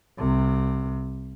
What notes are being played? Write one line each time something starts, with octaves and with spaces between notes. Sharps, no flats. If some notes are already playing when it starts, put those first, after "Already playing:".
C2 C3